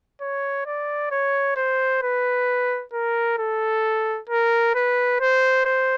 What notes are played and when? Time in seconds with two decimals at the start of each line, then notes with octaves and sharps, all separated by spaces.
0.21 C#5
0.66 D5
1.11 C#5
1.56 C5
2.03 B4
2.93 A#4
3.39 A4
4.30 A#4
4.75 B4
5.21 C5
5.65 C5